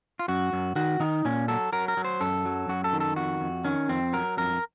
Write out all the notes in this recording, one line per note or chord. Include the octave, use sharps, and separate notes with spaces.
F4
F#2 F#4
F#2
D#3 F#4
D#3 D#4
A#2 C#4
F#3 A4
F#3 A#4
A#4
F#3
C5
F#2 A4
F#3
F#2 F#4
A4
D#3
A4
F2 F#4
F2
D#3 C#4
F2 C4
F#3 A#4
F2 A#4